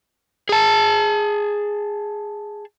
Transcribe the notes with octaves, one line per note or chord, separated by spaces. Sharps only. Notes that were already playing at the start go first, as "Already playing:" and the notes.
G#4 A5